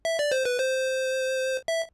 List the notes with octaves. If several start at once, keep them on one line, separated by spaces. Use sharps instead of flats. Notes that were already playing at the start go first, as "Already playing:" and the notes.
E5
D5
C5
B4
C5
E5